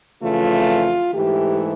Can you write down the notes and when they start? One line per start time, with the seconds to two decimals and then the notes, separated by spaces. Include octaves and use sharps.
0.21 F2 C#3 E3 A3 F4
1.13 G#2 E3 A3 G4